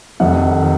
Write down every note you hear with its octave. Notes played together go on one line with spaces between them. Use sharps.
F1 F2 D#3 F#5
D#3